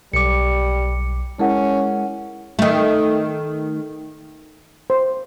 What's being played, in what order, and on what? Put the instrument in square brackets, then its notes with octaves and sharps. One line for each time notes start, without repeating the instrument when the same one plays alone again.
[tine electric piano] B1 D6 [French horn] G3 [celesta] C#7
[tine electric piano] G#3 [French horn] C#4 [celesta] E4 A#4 F#5
[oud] D#3 A3
[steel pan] C5